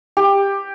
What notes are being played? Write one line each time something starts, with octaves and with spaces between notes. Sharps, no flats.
G4